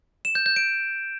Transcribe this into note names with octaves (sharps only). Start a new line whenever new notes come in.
E7
G6
G6
D7